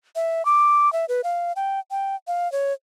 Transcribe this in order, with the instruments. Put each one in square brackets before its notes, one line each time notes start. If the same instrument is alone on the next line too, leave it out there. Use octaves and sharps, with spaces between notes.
[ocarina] E5
D6
E5
B4
F5
G5
G5
F5
C#5